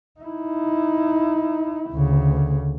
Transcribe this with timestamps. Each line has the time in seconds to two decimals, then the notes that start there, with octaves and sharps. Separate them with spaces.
0.21 D#4 E4
1.91 D2 C#3